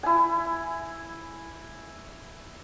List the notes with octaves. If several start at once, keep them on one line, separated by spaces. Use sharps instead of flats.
E4 G#5